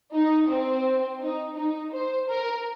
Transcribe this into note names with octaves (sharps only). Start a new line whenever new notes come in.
D#4
C4
D#4
D#4
C5
A#4